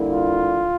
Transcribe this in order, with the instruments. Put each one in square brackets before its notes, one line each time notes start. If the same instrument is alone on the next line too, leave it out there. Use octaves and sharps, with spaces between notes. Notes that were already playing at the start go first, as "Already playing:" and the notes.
Already playing: [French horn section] D3 G3 A#3 E4
[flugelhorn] F4